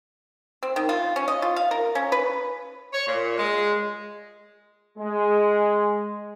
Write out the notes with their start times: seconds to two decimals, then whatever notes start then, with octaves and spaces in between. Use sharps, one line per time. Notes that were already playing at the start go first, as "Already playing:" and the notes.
0.63 C4
0.76 D#3
0.89 F4
1.16 C#4
1.28 D#5
1.42 F4
1.56 F5
1.71 A#4
1.95 C#4
2.12 B4
2.93 C#5
3.08 A#2
3.37 G#3
4.98 G#3